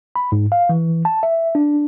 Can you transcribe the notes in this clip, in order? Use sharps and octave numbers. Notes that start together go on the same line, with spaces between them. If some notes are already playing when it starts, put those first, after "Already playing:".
B5
G#2
F5
E3
A5
E5
D4